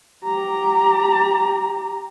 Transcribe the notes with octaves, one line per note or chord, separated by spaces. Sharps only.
G4 A#5